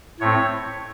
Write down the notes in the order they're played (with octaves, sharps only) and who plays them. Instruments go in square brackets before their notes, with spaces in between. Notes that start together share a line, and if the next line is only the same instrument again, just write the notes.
[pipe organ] A2 A3 C4 C#5